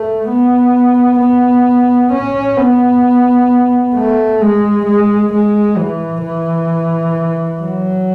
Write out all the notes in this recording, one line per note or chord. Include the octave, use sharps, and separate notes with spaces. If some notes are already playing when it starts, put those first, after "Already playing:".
Already playing: A3
B3
B3
C#4
B3
A3
G#3
G#3
G#3
E3
E3
F#3